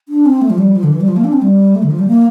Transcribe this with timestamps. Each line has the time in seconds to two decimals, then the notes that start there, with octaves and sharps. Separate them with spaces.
0.09 D4
0.26 C4
0.41 A3
0.50 F3
0.58 G3
0.76 F3
0.83 D3
0.92 E3
1.01 G3
1.08 F3
1.16 A#3
1.24 D4
1.33 C4
1.42 G3
1.75 A3
1.83 D3
1.91 F3
1.99 G3
2.08 A#3